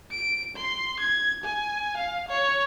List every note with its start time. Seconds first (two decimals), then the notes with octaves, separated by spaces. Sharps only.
0.11 D7
0.56 C6
0.99 G#6
1.43 G#5
1.97 F5
2.28 C#5